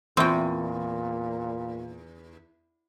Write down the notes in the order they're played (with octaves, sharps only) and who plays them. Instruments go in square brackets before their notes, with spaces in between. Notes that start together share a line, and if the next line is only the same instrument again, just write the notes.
[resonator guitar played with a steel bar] E2 [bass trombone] A#2 [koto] C4 G5 [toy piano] F4 E5 C#6